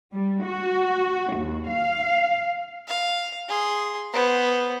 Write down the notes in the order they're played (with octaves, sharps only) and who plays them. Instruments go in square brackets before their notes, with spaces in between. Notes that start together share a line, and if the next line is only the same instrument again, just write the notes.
[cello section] G3
F#4
D#2
F5
[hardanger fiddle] F5
G#4 C6
B3 C5